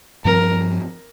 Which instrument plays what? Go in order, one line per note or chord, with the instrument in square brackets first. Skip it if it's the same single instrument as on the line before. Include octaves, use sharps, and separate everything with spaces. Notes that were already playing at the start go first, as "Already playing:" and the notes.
[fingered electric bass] G2 F3 C4 [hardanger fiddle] A#4